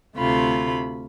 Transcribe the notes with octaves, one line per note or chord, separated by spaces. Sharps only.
D2 C3 A3 F4 B5